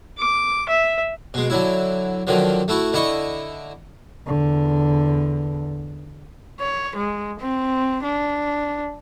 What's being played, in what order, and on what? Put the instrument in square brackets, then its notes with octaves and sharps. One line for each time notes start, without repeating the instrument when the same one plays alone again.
[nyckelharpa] D6
E5
[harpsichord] B2 G#3
D3 F#3 E4
D3 D#3 F3 F#3
A3 E4 F#4
D3 E4 D#5 C#6
[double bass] E2 D3
[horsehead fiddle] C#5
G#3
C4
D4